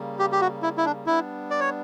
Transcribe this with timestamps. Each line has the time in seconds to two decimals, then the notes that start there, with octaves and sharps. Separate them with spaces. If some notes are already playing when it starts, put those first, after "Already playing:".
Already playing: C#3 G3 A#3
0.19 G4
0.32 G4
0.41 F#4
0.63 E4
0.78 E4
0.85 D4
1.06 G3 B3 D4 E4
1.51 D5
1.60 C#5